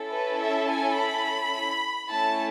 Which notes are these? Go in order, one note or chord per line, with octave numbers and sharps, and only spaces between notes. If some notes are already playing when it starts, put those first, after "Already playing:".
Already playing: C#4 E4 A4
B4
E5
G#5
B5
A3 C#4 E4 A4 A5